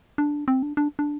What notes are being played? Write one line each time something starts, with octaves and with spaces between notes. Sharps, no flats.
D4
C4
D4
D4
D4